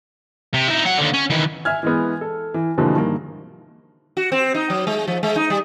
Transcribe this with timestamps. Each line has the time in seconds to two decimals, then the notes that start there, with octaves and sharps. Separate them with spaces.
0.54 C3
0.68 D#4 E4
0.85 F#3 F#5
0.98 D#2 D3
1.14 C#4
1.30 D#3 E3
1.65 E5 G#5 F6 G#6
1.83 E3 G#3 B3
2.21 A4
2.54 E3
2.78 B2 D3 E3 F3 G#3 A#3
2.95 G2 D#3 A#3
4.17 F#4
4.32 C4
4.54 D#4
4.70 F#3
4.87 G#3
5.08 F3
5.23 G#3
5.36 D#4
5.50 G3